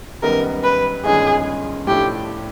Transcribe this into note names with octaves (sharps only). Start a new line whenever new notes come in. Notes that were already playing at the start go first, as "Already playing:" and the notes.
F#2 D#3 G3 B3 A#4
B4
G1 G2 D#3 G#3 C#4 G#4
A2 F3 A3 D4 G4